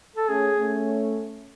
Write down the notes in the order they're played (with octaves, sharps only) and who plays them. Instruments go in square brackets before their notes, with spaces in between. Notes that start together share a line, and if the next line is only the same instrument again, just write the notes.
[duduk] A4
[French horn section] A3 C#4 [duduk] G#4
[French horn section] A3 C#4